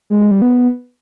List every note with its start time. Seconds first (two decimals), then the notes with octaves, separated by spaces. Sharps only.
0.10 G#3
0.21 G#3
0.31 G3
0.42 B3